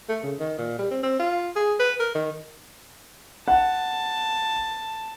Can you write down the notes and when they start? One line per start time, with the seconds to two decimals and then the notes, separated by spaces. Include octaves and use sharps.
0.09 A3
0.23 C#3
0.39 D#3
0.58 A#2
0.79 G3
0.91 C4
1.03 C4
1.20 F4
1.56 G#4
1.79 B4
2.00 A#4
2.15 D#3
3.48 F#5 A5